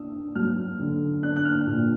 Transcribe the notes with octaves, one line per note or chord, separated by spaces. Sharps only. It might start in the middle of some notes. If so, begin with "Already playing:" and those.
Already playing: D4 D#6 E6
F#3 F6
D3
D4 F#6
F#6
F6
A#2